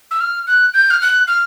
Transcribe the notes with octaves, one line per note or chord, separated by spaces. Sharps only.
E6
F6
F#6
G6
F6
F#6
F6